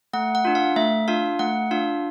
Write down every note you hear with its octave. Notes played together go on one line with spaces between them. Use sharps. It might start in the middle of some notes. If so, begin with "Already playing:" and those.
A3 F#5
F#5
D4 F4
F5
A3 E5
D4 F4 F5
A3 F#5
D4 F4 F5